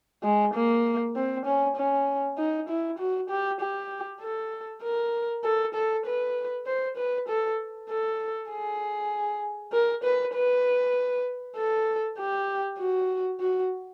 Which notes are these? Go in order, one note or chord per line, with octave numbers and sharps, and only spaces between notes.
G#3
A#3
C4
C#4
C#4
D#4
E4
F#4
G4
G4
A4
A#4
A4
A4
B4
C5
B4
A4
A4
G#4
A#4
B4
B4
A4
G4
F#4
F#4